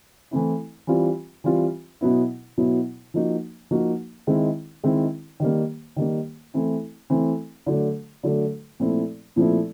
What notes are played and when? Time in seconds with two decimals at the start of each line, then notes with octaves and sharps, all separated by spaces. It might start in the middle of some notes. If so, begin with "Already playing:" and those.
0.31 E3 A3 C4 E4
0.87 E3 G3 C4 F4
1.44 E3 G3 C4 F4
2.01 B2 F#3 B3 E4
2.58 B2 F#3 B3 E4
3.14 F3 A#3 D#4 F#4
3.71 F3 A#3 D#4 F#4
4.27 D#3 G#3 C4 E4
4.83 D#3 G#3 C4 E4
5.40 D#3 G3 A#3
5.96 D#3 G3 A#3
6.54 E3 A3 C4 E4
7.10 E3 A3 C4 E4
7.66 D3 F#3 A3
8.23 D3 F#3 A3
8.80 A#2 F3 A3 C4 E4
9.36 A#2 F3 A3 C4 E4